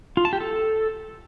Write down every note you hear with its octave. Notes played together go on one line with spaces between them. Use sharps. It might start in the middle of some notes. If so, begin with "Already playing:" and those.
F4
A5
G4
A4